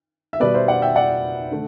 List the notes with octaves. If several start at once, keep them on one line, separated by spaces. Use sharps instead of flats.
E5
B2 G3 B3 B4 D5
C5 E5
D5 F#5
E5 G5
D5 F#5
D3 A3